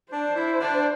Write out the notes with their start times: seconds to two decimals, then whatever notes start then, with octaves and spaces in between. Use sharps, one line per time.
0.12 D4 C5
0.36 E4
0.61 D4